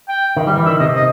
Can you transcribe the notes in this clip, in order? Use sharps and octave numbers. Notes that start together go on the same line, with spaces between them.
G5
D#3
G3
E3
D#3 E5
C3 D#5
D#5